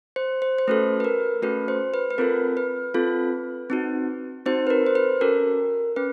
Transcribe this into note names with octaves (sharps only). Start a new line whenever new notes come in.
C5
C5
C5
A3 C#4 F#4 A4 B4
B4
A#4
A3 C#4 F#4 A4 B4
C5
B4
B4
C4 F4 A4 A#4
B4
C4 F4 A4
C4 D#4 F#4
C4 D#4 F#4 C5
B4
A#4
C5
B4
C#4 F#4 A4 A#4
C#4 B4